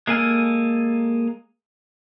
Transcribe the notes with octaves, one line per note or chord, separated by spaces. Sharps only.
G#3 A#3 A4 G#5 F6